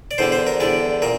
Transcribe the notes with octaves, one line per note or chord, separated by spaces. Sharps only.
D5
E2 D3 G3 C5
C5
A#4
E2 D3 G3 D5
A#2 A#4